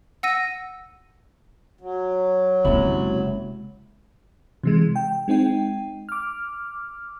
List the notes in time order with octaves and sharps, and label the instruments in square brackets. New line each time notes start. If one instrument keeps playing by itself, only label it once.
[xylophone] F#5 E6 A#6 D#7
[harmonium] F#3
[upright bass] F#1 G#3 [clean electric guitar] C3 E4
[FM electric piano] C3 E3 G#3
G5
G#3 C4 D#4 G5
D6 F6